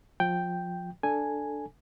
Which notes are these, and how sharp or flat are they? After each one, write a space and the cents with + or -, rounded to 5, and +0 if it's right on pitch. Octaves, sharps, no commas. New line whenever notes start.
F3 +25 G5 +0
D4 +0 A4 +0 G#5 +0